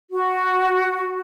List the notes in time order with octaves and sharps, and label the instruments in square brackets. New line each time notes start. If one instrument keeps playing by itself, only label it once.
[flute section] F#4